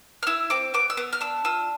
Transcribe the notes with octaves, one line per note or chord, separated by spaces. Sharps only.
F6
E4 E6
C4 D6
B3 D6
E6
B3
F6
D4 E6
F4 E6